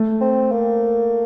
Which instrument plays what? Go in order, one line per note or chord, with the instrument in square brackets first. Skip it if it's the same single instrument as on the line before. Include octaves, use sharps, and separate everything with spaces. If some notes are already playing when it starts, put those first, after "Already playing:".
Already playing: [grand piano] A3
[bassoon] C4
A#3